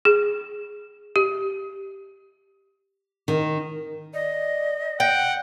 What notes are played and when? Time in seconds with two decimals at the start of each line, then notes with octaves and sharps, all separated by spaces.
0.05 G#4
1.16 G4
3.28 D#3
4.14 D5 D#5
5.00 F#5 G5